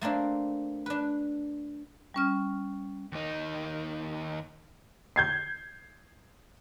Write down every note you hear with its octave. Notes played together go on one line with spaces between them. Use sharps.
A3 A#3 C4 D4
D4 B4
G3 C#4 F6
D#2 D#4
G6 G#6 C7